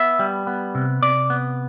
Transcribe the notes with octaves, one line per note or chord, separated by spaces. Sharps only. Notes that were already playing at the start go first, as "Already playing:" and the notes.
Already playing: B3 E5
G3
B3
C3
C3 D5
B3